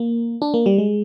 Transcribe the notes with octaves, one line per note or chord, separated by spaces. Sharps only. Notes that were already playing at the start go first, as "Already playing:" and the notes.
Already playing: A#3
D4
A#3
G3
G#3